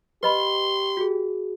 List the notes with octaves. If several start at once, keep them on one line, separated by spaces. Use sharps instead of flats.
G4 B4 D#5 B5 C6
F#4 G#4